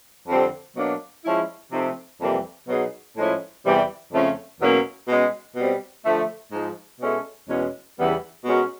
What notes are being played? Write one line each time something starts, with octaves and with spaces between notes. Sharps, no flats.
F2 D3 G3 C4
B2 F#3 A#3 D4
F3 G#3 C#4 E4
C3 F3 A3 C4 D#4
F2 C3 E3 G3 A#3
B2 F#3 B3 D#4 G#4
A2 F3 G#3 C#4 E4
E2 C3 E3 G3
F2 C#3 F3 A3 C#4
E2 B2 F#3 A#3 C#4
B2 G#3 C#4
B2 G3 C4
D3 F3 A3
G#2 F3 G#3
B2 G#3 C#4 E4 A4
E2 B2 G#3 C#4
E2 C#3 E3 G3 B3
B2 G#3 C#4 F#4 A#4